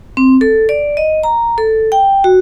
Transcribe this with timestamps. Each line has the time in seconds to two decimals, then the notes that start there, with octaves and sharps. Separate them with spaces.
0.17 C4
0.41 A4
0.69 D5
0.97 D#5
1.23 A#5
1.58 A4
1.92 G5
2.24 F#4